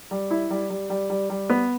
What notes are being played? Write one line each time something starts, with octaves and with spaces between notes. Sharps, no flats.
G3
E4
G3
G3
G3
G3
G3
B3